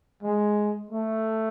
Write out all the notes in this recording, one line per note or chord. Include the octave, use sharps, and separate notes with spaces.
G#3
A3